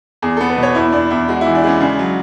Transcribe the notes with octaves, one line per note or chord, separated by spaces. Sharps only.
E2 G#4
B3 A4
B4
B2
C#5
E2 E4
E2 D4
E2 E4
G#3 F#4
E3 E4
D4
G#3 C#4
C#3 D4
F#3